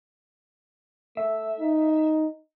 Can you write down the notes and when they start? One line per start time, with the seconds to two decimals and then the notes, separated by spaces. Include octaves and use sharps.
1.17 A3 E5
1.60 D#4